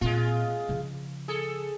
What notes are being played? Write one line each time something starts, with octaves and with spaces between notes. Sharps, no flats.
A#2 G#3 C4 F4
C#3 F3
G#4 A4